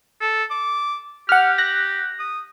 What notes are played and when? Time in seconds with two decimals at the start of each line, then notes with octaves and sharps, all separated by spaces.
0.21 A4
0.51 D6
1.29 G4 F#5 F6
1.58 F#6 A#6
2.20 D#6